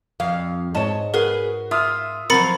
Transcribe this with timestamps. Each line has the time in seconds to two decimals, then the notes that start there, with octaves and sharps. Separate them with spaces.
0.20 F2 F5
0.74 G#2 C#5 D#5 A5
1.14 F#4 G#4 A#4 B4
1.71 F4 E5 D#6 F6
2.30 F3 F#3 C4 A#4 B5 A6 C#7